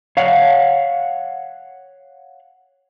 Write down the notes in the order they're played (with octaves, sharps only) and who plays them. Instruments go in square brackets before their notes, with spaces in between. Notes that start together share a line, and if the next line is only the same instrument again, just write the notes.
[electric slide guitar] C#5 F5 F#5